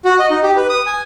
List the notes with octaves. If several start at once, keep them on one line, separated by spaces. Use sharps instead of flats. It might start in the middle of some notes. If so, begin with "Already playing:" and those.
F#4
D#5
D#4
G4
B4
D#6
G#5